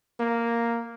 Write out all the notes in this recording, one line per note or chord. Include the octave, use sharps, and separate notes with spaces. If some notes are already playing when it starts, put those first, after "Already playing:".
A#3